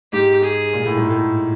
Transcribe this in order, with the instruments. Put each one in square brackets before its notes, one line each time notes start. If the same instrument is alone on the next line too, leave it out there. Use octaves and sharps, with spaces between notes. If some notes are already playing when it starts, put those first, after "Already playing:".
[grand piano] G#2 [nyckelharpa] G4
[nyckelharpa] G#4
[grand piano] A#2
A2
G#2
A2